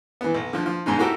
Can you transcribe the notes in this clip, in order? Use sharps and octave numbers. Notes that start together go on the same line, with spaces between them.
E3 B3
B1
D3 F3
F3
G#2 B2 G#3 D#4
A#3 D#4 E4 F#4 G4 A4